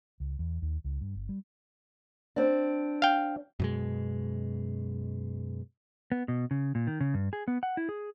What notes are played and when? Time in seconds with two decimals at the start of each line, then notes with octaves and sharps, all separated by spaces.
0.20 C#2
0.39 E2
0.62 D#2
0.84 C#2
1.01 G2
1.15 G1
1.29 G3
2.36 C4 D4
3.02 F5 G5
3.60 F#2 B2 G#3
6.12 B3
6.28 B2
6.51 C#3
6.75 A#2
6.87 D#3
7.00 C#3
7.14 G2
7.33 G#4
7.48 B3
7.63 F#5
7.77 E4
7.89 G#4